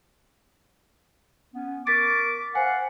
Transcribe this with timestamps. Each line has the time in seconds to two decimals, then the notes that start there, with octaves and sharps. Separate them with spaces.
1.55 B3 C#4
1.87 A#4 C#6 D6 A6 B6
2.55 C5 F5 F#5 G#5